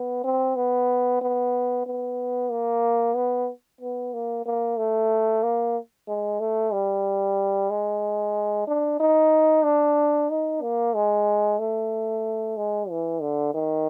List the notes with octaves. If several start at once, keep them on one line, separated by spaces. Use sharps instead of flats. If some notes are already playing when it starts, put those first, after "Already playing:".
Already playing: B3
C4
B3
B3
B3
A#3
B3
B3
A#3
A#3
A3
A#3
G#3
A3
G3
G#3
D4
D#4
D4
D#4
A#3
G#3
A3
G#3
E3
D3
D#3